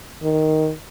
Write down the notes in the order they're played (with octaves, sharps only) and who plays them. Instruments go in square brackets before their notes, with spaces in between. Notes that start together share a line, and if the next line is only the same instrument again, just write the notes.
[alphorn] D#3